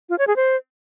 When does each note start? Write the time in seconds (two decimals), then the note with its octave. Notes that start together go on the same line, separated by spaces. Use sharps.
0.09 F4
0.18 C#5
0.27 G#4
0.36 C5